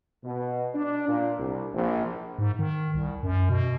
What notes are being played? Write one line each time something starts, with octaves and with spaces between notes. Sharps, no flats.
B2
D4
A#2
C2
A#1
G#2
D#3
C2
F#2
B2